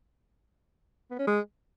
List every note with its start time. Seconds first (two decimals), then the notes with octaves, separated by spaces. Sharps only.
1.11 B3
1.19 C#4
1.27 G#3